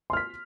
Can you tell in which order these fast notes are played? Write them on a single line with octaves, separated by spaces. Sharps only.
C6 F6 B6